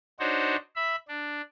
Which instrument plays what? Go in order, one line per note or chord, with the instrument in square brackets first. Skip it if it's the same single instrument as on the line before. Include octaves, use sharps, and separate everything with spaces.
[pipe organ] D4 D#4 F#4 C5 C#5
E5 B5
D4